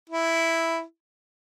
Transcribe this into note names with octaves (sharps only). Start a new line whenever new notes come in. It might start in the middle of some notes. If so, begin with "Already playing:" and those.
E4